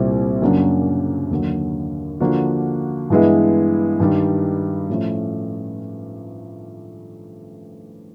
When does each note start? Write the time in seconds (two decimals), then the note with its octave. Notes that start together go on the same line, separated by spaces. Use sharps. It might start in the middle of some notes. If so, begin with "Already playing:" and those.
Already playing: C2 A#2 G3 C4 E4
0.42 F#2 C#3 F#3 A#3 D4
1.31 D#2 D3 F#3
2.20 D3 F3 A#3 D4 F#4
3.10 G2 E3 G#3 B3 E4
4.00 G2 D#3 G3
4.89 A2 F3 A3 C#4